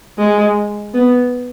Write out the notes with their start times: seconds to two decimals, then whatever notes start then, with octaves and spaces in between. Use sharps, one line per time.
0.18 G#3
0.94 B3